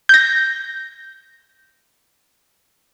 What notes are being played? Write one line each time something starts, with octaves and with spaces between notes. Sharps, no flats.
G6 A#6